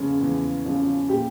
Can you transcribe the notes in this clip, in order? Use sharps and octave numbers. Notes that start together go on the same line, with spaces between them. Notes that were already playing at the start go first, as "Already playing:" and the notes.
Already playing: E2 C#3 F3 G#3 C#4
E2
C#3 F3 G#3 C#4
A#2 G4